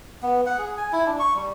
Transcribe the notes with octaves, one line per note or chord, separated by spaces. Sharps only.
B3
F#5
G#4
G#5
E4
D4
C#6
G3